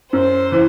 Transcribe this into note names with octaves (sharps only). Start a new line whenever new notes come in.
F#2 C5
E3